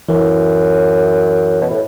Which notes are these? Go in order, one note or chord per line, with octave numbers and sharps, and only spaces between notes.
F#2 E3
B2
A2